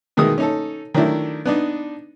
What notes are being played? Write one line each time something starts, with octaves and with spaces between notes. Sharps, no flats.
B2 D#3 G#3 D#4 D#6
C#4 D#4 A4
D#3 F#3 A3 D4 E4
B3 D4 D#4